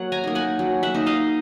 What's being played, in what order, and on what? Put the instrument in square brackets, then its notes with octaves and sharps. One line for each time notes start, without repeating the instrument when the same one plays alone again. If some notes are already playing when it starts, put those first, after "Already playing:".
Already playing: [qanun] F#3 A#3 F#5
G#5 A#5
A#3 D#4
F#5 G#5
F#3
E5 F#5
A#3 D#4
D#5 F5